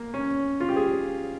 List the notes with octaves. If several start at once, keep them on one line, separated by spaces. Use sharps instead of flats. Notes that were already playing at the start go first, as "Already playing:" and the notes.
Already playing: A#3
C#4
F4
G4
G#4